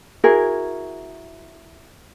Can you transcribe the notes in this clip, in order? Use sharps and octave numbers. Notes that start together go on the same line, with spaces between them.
E4 F#4 G#4 A#4